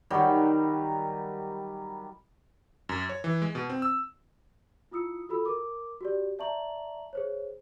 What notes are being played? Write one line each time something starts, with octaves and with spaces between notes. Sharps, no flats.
D#3 F#3 G3
F#2
C#5
E3
G#3
B2
C4
E6
E4 F4 D#6 E6 C#7
F4 F#4 A4 B5 E6
A#4 D6
F#4 G4 D5
D5 E5 A5 A#5 C#6 F#7
G#4 C5 C#5